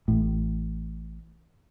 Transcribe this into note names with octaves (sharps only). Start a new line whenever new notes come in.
A1 A2